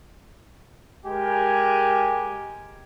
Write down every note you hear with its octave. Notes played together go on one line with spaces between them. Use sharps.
G#3 G4 A#4 G#5